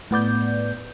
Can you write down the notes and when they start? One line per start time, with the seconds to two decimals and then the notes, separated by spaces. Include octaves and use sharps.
0.11 A2 B3 D5 G6